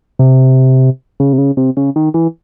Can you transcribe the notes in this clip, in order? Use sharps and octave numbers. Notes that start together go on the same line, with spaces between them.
C3
C#3
C3
C#3
C3
C#3
D#3
E3